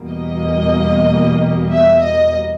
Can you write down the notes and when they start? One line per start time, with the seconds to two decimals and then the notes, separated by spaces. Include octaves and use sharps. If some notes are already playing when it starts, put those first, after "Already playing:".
Already playing: E2 B2 G3 A#3
0.11 D#5
1.71 E5
2.02 D#5